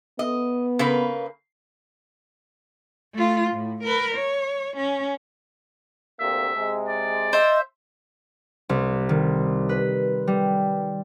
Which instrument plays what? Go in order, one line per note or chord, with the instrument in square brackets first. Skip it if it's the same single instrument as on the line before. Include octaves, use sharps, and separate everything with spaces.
[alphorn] B3 [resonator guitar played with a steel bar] D#5
[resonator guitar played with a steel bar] C#3 A#3 B4
[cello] A3 F4
A2
A#4 B4
C#5
C#4
[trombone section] D2 C3 A#3 [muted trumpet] E5
[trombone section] C3 G#3
[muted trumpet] D5
[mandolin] C5 E5 [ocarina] D#5
[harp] C2
D#3
B4
G3